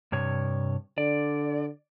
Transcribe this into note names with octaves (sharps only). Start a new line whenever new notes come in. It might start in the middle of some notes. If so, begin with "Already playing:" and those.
G2 C3 C#5
D3 D5